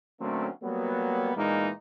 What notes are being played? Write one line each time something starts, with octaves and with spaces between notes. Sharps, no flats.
D3 F#3 A3 A#3 C4 C#4
F#3 G3 A#3 B3
A#2 E3 G#3 A#3 B3 D#4